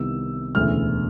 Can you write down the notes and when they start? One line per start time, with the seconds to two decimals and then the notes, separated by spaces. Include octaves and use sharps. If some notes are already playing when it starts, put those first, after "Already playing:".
Already playing: C2 C3 D#3 G3 B3 E6
0.55 E1 D2 C#3 E3 F6